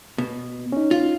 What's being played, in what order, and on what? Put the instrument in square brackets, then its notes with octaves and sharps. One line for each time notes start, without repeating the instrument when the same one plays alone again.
[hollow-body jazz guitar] B2
[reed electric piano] C#4 D#4
[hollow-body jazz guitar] F4